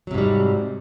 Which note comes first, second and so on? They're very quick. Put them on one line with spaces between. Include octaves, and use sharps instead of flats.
F#3 C3 G#2 G3